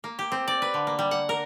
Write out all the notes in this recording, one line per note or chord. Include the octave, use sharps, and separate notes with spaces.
A#3
G4
C4
D5
B4
D3
A#3
G3
F#5
A#4